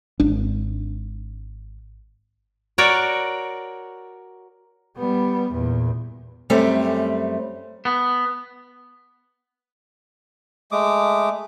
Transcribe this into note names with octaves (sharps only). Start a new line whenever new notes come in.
G#1 D4
F#4 A#4 C#5 D5
G3 B3
E2 A#2
F#2 G3 A3 C4
B3
G#3 A3 D6 D#6